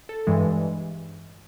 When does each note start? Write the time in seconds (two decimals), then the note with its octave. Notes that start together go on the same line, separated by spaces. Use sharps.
0.09 A4
0.27 G2 E3 G#3